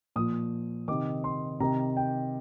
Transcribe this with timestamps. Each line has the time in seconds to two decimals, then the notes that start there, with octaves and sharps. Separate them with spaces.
0.16 A#2 F3 D#6
0.88 C3 D#3 D6
1.24 C6
1.60 C3 D#3 A#5
1.97 G5